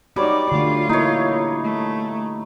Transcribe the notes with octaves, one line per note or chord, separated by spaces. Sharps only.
G3 D#4 F#4 C#5 D5
D3 A3 F4
A#3 D#4 E4 C#5
A3